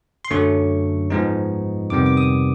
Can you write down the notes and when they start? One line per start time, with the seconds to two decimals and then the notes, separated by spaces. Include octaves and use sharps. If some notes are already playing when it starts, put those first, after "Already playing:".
0.25 C6
0.30 F#2 D3 F#3 A3 C#4 C#6
1.10 G#2 F3 G#3 B3 D#4
1.90 F2 C3 D#3 G3 B3 D6
2.06 D6
2.17 D#6